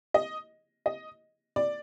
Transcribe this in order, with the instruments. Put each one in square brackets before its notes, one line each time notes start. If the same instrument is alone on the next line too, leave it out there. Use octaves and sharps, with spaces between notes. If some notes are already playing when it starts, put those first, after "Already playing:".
[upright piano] D#5
D#5
D5